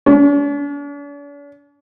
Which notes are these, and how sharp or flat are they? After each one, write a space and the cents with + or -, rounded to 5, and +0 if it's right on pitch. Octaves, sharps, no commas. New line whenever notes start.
D4 -45